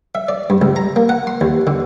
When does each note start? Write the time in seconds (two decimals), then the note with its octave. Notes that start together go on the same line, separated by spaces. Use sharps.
0.15 E5
0.29 D5
0.50 G2
0.62 C#2
0.76 A#5
0.96 A#3
1.09 F#5
1.27 C6
1.41 D#2
1.67 D3